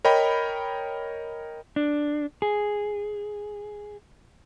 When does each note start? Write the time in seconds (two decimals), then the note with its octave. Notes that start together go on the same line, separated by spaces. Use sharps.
0.05 A#4 C#5 D#5 G5 B5
1.76 D4
2.42 G#4